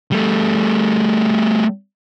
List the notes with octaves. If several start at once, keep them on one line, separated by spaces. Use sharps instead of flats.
G3 A3